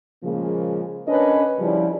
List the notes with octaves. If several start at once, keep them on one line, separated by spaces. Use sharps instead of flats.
A#2 C#3 F3 G#3 A#3
C#4 D4 A#4 B4 C#5 D#5
C#3 F3 G3 E4 D5